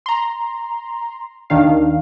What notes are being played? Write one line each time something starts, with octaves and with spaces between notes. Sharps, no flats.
A#5 C6
D#2 D#3 D4 F5